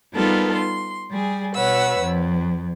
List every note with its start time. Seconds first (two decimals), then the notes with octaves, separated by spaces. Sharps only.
0.14 G3 B3 D#4 F4 A4 A#4
0.54 C6
1.11 G3 G#4
1.54 B2 B4 C#5 F#5 E6
2.00 F2